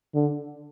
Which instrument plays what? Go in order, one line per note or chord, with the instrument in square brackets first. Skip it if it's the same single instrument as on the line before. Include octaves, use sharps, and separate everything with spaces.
[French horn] D3